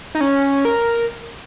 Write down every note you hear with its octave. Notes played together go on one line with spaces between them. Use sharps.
D#4
C#4
A#4